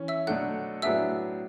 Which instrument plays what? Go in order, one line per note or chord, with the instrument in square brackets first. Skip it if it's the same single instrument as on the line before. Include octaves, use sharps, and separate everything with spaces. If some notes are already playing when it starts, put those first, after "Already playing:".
Already playing: [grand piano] E3 C#4
[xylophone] E5 E6
[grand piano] B2 F#3 A3 D4 A4 [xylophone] F#5 F#6
[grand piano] A2 F#3 B3 D4 G#4 [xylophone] E5 E6